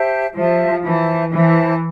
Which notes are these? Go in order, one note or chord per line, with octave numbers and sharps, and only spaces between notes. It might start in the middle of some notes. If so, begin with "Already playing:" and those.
Already playing: G4 C5 E5 A5
F3 G4 C5 E5 A5
E3 C5 E5 A5
E3 C5 E5 A5